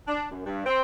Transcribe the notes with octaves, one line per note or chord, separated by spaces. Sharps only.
D4
F#2
G2
C4